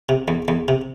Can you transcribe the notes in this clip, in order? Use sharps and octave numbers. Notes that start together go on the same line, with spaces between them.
C3
E2
E2
C3